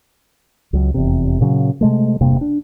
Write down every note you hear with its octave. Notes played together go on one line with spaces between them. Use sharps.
C#2 F#3
F1 E2 C3
A#2 C#3 F#3
C3 G#3 A3
E1 G2 C3 A#3
D4